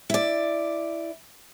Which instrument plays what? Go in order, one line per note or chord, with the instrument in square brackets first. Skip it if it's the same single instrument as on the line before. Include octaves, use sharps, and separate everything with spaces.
[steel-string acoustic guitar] E4 D5